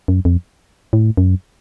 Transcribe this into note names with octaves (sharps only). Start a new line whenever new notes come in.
F#2
F2
A2
F#2